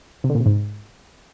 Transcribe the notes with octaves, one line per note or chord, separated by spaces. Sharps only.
C3
D3
A#2
C3
G#2